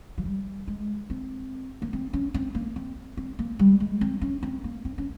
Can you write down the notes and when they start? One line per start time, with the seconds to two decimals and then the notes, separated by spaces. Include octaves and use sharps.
0.18 F3
0.25 G3
0.68 G#3
1.10 C4
1.82 A#3
1.93 C4
2.13 C#4
2.34 C4
2.55 A#3
2.76 C4
3.17 C4
3.39 A#3
3.59 G3
3.80 G#3
4.01 C4
4.21 C#4
4.43 C4
4.64 A#3
4.85 C4
4.98 C#4